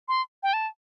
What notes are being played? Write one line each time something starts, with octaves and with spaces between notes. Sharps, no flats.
C6
G5
A5